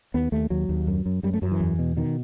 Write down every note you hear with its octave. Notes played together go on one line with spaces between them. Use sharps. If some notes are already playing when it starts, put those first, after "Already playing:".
D#2 B3
D#2 A3
D#2 F#3
D#2
F#2
F#2
F#2 G3
A3
F#2 F#3
E3
E2
B2
B2 D#3